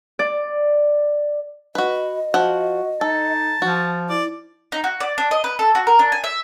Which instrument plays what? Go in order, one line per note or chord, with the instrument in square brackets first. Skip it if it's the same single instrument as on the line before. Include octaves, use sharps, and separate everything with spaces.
[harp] D5
[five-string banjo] F#4 B4 [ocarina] D#5
[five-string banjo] F3 F#5 [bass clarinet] F#4
[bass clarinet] D#4 [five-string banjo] A4 [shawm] A5
[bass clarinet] F3 [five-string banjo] F#4
[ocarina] E4 [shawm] D5
[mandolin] D#4
F#4
D5
D4
D#5
B4
A4
F#4
A#4
D4
G#5
E5